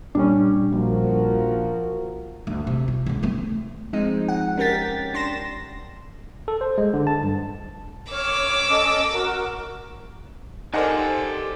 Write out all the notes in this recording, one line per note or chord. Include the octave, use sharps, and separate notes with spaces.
A#2 G3 C#4 D4
A#1 F3 F#4 A#4
D2
C3
F4
C#2 D3
A3 C4
F3 G#3 C4 D#4
F#5
C#4 G4 A#4 G5 A6 B6
D4 C6 A#6 E7
A4
C5
G#3
D3
A5
G2
C#5 D6 E6 F6
C#4 A4 D#5
F#4 A#4
D#4 G4 A4 A#4 C5 D5 F#5 G#5